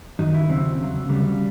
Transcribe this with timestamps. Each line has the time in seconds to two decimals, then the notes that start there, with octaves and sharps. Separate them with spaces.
0.19 F#2 D#3 F#3 D#4
0.34 E4
0.49 D#2 C#3 F#3 C4
0.79 E2 C#3 F#3
1.09 D2 C#3 F#3 G3